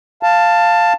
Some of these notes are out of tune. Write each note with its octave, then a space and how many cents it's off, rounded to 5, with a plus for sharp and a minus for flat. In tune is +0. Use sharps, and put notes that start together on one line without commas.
F5 +0 A5 +10